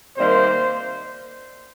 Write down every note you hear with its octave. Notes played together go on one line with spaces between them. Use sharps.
C3 D#3 G3 A#3 C5